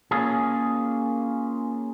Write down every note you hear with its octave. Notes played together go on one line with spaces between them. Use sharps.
A#3 C#4 F4 G#4